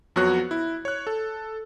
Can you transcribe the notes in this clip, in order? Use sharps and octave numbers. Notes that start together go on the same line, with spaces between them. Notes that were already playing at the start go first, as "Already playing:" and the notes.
F2 F#3 B3 F#4 C#5 F#6
E4
C#5 F#6
A4